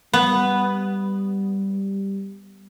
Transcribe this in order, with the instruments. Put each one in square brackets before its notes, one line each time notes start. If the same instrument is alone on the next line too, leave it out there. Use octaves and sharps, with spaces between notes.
[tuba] G3 [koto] B3